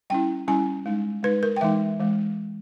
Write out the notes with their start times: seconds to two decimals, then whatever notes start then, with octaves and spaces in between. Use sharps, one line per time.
0.10 G3 C#4 E4 G5
0.48 G3 C#4 E4 G#5
0.86 G#3 D#4
1.23 G#3 D#4 B4
1.43 A#4
1.56 G5
1.61 E3 G#3 D#4 E5
2.00 E3 G#3